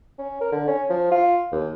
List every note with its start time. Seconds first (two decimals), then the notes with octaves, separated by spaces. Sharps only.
0.19 C#4
0.41 A#4
0.52 D3
0.68 C#4
0.90 F3
1.11 F4
1.52 D#2